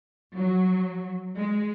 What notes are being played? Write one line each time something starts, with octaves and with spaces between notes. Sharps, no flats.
F#3
G#3